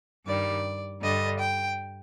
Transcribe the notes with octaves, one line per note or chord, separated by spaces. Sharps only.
G2 D#3 G3 D5
G2 D3 G3 D#5
G5